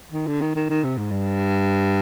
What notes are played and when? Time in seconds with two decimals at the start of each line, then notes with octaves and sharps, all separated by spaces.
0.12 D#3
0.27 D3
0.41 D#3
0.55 D#3
0.70 D#3
0.84 C3
0.98 G#2
1.11 G2